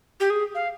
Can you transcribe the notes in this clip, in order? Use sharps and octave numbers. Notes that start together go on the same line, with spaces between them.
G4
G#4
F5